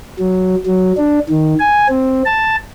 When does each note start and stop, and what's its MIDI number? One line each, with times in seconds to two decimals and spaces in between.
0.19 0.55 54
0.66 0.93 54
0.97 1.19 62
1.29 1.55 51
1.59 1.87 80
1.89 2.23 60
2.25 2.56 81